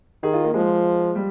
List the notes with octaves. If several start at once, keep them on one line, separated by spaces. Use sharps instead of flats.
D#3 G#4
F4
A#3
F3 G#3
G3